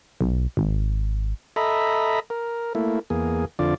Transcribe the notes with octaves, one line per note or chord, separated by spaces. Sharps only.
B1
G#1
A4 D#5 E5 A#5 B5
A#4
A3 A#3 E4
E2 A#3 G#4
F2 D3 F4 D5